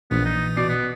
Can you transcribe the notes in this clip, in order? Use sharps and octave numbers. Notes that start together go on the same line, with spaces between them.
A#1 A#2 E3 B3
D#4
B2 D5 C7
B3